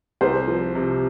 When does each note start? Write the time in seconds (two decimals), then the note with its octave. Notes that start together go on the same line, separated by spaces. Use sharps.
0.21 C2 C5
0.48 F3
0.75 C3